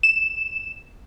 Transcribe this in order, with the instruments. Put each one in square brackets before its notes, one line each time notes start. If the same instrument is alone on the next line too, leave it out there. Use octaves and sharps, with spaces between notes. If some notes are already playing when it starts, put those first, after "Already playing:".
[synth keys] E7